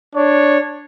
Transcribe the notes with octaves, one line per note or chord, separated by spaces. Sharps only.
D4 C#5